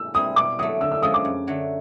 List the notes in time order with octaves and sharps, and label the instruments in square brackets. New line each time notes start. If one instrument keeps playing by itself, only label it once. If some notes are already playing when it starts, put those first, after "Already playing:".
Already playing: [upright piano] E6
[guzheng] G3 C4 E4 [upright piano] D#6
[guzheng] B2 [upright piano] D6
[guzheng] F#3 A3 [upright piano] D#6
[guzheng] D3 [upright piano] E6
[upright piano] E6
[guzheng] F3 G#3 C#4 F4 [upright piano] D#6
[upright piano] D6
[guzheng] F#2
D3 F#3 A3